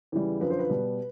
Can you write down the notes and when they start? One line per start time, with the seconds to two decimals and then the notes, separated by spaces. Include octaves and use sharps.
0.12 E2 C#3 E3 G3
0.41 F#2 D3 F3 B4
0.50 C5
0.59 B4
0.69 B2 G3